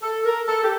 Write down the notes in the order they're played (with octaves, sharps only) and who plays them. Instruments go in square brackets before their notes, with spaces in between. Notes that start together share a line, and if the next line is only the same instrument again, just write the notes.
[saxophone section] A4
A#4
A4
G4